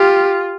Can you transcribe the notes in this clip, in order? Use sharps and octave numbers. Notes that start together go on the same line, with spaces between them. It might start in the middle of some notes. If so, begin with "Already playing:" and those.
Already playing: F4 G4